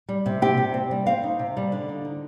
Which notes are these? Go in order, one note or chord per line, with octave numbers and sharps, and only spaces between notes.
G3
C3
C4 G4
C3
C4
G3
C4 F5
D#4
C3
G3
D3
D#4
D#4